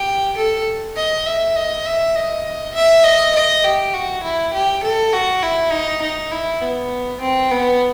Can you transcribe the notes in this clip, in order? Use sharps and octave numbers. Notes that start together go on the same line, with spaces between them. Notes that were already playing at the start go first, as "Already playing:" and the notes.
Already playing: G4
A4
D#5
E5
D#5
E5
D#5
E5
D#5
D#5
G4
F#4
E4
G4
A4
F#4
E4
D#4
D#4
E4
B3
C4
B3